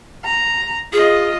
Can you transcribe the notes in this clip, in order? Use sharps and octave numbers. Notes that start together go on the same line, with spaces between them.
A#5
F4 G#4 D#5